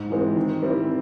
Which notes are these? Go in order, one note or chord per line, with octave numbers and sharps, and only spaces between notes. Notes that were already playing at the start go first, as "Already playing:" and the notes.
Already playing: G#2
E3 G#3 C4
D#3
G3 C4 E4